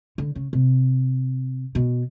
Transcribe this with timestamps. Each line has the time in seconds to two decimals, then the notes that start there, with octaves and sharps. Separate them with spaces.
0.18 D3
0.35 C#3
0.53 C3
1.75 B2